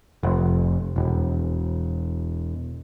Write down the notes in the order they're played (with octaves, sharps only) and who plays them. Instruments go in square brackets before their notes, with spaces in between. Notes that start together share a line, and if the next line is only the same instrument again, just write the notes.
[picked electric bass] F1
E1